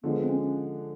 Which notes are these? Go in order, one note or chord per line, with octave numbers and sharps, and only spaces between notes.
D3 F3 G#3 B3
C4
C#4